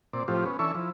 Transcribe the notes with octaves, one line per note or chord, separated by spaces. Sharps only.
A#2 C4 D5
A2 F3 C4 F4 G4
B3 C#4
E3 C#4 D4 A4 E5 C#6
F3 E4